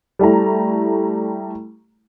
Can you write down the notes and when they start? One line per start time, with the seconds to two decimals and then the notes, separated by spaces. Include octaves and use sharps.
0.19 G3 A3 E4 A#5